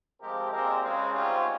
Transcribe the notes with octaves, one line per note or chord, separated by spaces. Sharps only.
C3 F3 G#3 C4 G4 A#4
A#2 G#3 C4 G4 A#4
C#3 G#3 C4
G#2 G3 C4 C#4 F4